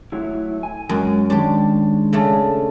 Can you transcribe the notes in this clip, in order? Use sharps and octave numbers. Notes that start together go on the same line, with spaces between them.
F#3 A3 E4
G#5
F#2 G#3 F#4 G#5
D#3 G#3 D4 G4 C#5
C#3 A3 D4